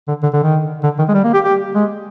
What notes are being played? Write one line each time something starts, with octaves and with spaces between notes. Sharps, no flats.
D3
D3
D3
D#3
D3
D#3
G#3
G3
A#3
G4
G4
G#3